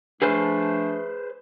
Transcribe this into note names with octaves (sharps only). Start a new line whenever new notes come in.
F3 A3 D4 G#4 B4 C5